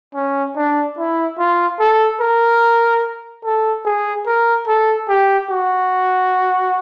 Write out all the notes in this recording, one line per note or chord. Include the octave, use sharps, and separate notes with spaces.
C#4
D4
E4
F4
A4
A#4
A4
G#4
A#4
A4
G4
F#4